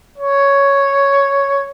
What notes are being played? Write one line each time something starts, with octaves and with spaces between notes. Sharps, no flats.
C#5